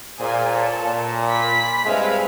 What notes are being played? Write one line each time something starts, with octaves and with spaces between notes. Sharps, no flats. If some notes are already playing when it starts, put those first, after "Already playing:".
A#2 G#4 C5 G#5
A4 C#5
A#2
B5 B6
G2 G#3 C4 B4 E5 F5